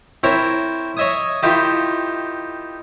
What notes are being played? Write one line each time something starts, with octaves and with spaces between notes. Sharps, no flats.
C4 E4 A#4 C#5
C#5 D#5 E5 G#5 D#6
D#3 E4 F4 G4